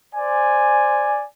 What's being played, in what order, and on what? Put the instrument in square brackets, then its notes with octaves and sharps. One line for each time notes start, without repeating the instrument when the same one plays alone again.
[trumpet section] C5 D5 G#5